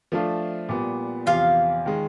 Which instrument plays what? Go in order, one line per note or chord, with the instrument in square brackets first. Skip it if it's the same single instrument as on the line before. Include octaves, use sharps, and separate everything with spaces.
[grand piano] F3 A3 D4 F4 A4
A#2 G3 B3
[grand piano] E2 C3 F3 [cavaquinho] F4 F5
[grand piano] D#3 G#3